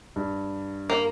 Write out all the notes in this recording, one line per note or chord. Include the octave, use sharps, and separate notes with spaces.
G2
A#3